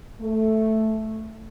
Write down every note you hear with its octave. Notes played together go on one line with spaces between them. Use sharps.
A3